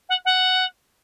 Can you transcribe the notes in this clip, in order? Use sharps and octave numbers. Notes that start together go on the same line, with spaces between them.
F#5
F#5